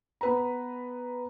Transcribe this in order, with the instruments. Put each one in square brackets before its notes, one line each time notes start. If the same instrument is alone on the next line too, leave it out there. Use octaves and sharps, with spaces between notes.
[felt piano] B3 B4 A#5